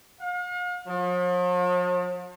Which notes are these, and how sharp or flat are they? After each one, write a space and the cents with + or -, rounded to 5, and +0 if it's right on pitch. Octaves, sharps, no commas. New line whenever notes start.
F5 +45
F3 +45